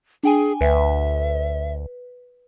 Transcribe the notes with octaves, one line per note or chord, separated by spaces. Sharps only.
D4 G#4 G5 G#5
D2 B4 E5